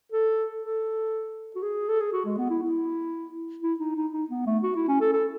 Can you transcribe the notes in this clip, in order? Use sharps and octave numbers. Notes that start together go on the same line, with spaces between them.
A4
A4
F#4
G#4
A4
G#4
F#4
G#3
B3
E4
E4
E4
D#4
D#4
D#4
B3
A3
F#4
E4
C#4
A4
A4